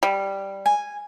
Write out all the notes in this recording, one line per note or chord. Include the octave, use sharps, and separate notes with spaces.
G3
G#5